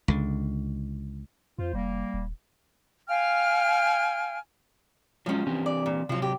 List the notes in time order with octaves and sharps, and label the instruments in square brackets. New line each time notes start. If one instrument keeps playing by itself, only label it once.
[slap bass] C#2 D3
[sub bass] F2 [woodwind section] F4 C5
[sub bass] F1 [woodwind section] G3 A#3
[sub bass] D#1
[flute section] F5 G5 G#5 F6
[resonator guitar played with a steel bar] F3 C#4 [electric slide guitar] F#3 G#3 F4
[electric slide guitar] E3 C4 G4
[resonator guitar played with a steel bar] D5
A#2
[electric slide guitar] C3 F#3 [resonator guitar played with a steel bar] F3 F4
[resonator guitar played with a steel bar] G4